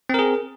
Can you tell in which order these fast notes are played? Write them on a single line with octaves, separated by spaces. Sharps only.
C4 A#4 G#4